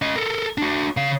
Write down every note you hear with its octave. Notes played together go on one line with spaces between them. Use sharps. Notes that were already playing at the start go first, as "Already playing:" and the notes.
C#4 D#5
A4 A#4
D4 F#4
C#3 F5